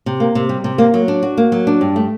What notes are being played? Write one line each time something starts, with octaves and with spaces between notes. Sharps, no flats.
C3
A#3
C3
G3
C3
A#3
F#3
D4
F#4
A#3
F#3
D4
G2
A3